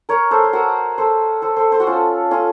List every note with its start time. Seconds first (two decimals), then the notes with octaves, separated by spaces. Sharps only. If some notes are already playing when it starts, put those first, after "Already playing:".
0.09 A#4 C#5
0.31 A4 C5
0.44 C5
0.53 F#4 A#4
0.98 A4 C5
1.42 A4 C5
1.56 A4 C5
1.72 A4 C5
1.80 F#4
1.87 C#4 F4
2.31 C#4 F4